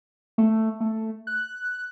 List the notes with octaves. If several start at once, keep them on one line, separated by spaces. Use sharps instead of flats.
A3
A3
F#6